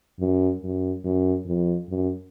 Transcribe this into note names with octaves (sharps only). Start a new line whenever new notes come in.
F#2
F#2
F#2
F2
F#2